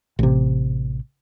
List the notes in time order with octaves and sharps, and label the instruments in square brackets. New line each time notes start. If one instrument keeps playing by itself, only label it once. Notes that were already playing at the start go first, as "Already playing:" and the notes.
[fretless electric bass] A1 C3